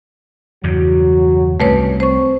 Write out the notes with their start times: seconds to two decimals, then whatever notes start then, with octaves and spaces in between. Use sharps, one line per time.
0.64 E2 G2 C#3 F#3 F#4
1.60 C2 C3 A3 C#4 B4 C#5
2.00 C4 C5 C#6